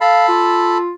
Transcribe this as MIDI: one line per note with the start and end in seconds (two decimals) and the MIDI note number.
0.01 0.78 69
0.01 0.25 77
0.01 0.78 81
0.01 0.78 83
0.28 0.91 65